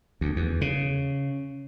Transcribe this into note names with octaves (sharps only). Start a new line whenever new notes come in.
D2
E2
C#3